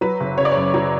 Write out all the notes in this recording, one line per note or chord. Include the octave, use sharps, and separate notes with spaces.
F#3 B4
F#1
C#3 C#5
D5
C#5
F#2
F#3 C#5